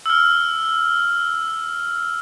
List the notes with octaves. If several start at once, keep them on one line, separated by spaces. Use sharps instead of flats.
E6 F6